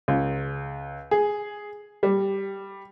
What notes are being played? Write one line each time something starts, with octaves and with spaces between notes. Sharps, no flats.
C#2
G#4
G3